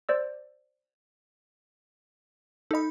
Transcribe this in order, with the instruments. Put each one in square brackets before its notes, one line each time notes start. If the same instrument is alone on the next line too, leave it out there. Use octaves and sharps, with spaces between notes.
[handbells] C5 D5 E6
[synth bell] D#4 B5 [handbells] A4 D#5